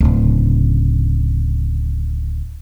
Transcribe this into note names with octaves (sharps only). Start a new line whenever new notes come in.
D1 C#3